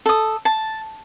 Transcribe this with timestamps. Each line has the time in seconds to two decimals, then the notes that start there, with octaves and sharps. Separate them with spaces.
0.06 A4 D#6
0.45 A5